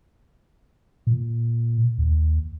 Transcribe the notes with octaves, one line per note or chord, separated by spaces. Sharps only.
A#2
D#2